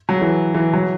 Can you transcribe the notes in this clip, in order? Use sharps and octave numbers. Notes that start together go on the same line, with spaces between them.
F#3
E3
E3
F#3